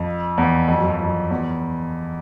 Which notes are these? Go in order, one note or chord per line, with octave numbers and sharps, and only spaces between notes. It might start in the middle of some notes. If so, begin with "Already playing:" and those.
Already playing: F2
E2
F2
F#2
F2
F2
E2